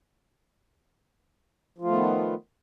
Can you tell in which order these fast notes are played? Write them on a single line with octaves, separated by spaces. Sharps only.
F3 F4 A3 D#3 B3